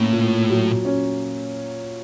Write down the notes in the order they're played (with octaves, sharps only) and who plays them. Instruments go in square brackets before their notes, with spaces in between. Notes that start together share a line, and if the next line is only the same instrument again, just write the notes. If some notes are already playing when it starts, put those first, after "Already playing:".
Already playing: [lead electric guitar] A2 [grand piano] A#3 C#4
[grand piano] A#2
F#3
C#4